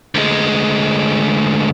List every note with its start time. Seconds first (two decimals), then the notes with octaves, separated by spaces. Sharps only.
0.15 D2 G#3